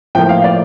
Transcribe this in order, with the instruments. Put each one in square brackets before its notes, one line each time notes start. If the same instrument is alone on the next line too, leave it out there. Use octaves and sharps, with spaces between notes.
[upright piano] A2 F3 A#3 G5
F5
D5